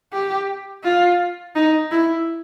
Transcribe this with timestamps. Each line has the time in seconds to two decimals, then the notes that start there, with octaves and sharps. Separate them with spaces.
0.13 G4
0.84 F4
1.55 D#4
1.91 E4